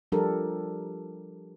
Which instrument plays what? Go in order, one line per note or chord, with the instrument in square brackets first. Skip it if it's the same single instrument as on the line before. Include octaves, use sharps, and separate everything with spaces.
[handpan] F3 G3 D4 G4 A4 A#4